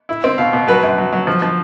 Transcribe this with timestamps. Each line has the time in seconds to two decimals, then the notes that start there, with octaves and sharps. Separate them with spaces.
0.09 E4
0.24 C4
0.38 B2 F5
0.53 B2
0.67 F#3 B4
0.83 F#2
0.98 F#3
1.12 F#3
1.27 F3
1.42 F3